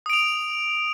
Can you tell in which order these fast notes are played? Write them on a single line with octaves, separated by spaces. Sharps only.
D#6 D7 F7